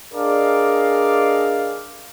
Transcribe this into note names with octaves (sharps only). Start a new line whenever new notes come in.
D4 G#4 A#4 D5 D#5 F5